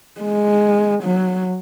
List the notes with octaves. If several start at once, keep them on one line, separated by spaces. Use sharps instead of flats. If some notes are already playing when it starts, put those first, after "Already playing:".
G#3
F#3